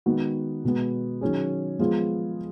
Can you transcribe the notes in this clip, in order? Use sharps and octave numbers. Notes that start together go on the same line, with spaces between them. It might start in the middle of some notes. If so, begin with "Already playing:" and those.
D#3 G#3 B3 F#4
B2 G#3 B3
D#3 F#3 C#4 G#4
F3 G#3 B3 F4 G#4